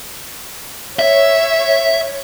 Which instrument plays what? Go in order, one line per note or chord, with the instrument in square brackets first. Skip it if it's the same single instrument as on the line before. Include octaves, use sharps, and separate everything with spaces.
[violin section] C#5 [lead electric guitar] E5